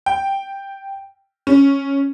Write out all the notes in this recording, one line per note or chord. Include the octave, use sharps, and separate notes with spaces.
G5
C#4